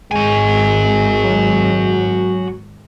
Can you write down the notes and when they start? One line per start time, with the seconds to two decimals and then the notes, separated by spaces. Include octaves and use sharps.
0.12 G#1 G#3 F#4 G#5
1.22 F#3